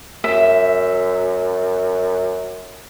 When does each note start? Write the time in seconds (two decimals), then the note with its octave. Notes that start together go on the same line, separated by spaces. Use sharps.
0.24 F#2 E5